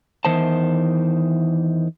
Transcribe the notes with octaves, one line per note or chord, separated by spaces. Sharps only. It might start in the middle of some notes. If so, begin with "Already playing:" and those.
E2 D#3 E3 C5 A5